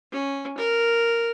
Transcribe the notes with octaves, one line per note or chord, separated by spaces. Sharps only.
C#4
A#4